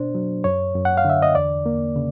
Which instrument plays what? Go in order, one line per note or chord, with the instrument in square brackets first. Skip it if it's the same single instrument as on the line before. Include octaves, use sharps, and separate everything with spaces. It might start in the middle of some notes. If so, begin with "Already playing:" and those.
Already playing: [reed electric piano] B2 D4 C5
F#3
F#2 C#5
F#2
F#5
F5
D3 E5
D#5
E2 D5
A#3
C#3